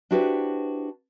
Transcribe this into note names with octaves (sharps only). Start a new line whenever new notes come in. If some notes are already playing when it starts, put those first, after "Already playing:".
D4 E4 F#4 G4 B4 C5